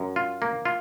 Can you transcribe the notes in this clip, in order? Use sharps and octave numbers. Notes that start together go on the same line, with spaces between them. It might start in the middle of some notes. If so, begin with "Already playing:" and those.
Already playing: F#2
F4
A#3
F4